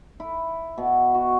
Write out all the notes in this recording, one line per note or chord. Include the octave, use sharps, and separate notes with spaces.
E4
B2
F#4